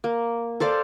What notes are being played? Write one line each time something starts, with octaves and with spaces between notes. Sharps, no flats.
A#3
A4 C5 D5 F5